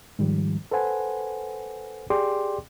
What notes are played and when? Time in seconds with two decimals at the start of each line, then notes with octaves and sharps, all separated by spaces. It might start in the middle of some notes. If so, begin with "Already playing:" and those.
0.19 G#2 D#3 F3 G3
0.71 A4 B4 C5 F#5 G#5
2.10 G4 G#4 D5 G5 C6 D6